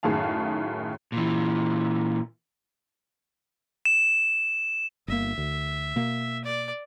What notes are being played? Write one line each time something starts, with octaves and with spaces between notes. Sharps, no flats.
F#2 A2 D#3 G#4 F5 A5
A#2 E3
E7
G1 A#3 E5
D2
B2 A#3
D5